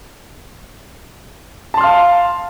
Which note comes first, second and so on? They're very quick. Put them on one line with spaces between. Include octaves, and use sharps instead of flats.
A5 C6 F6 F5